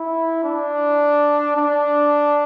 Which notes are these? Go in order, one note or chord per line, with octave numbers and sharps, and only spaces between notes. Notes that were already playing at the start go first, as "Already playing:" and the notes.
Already playing: E4
D4
D4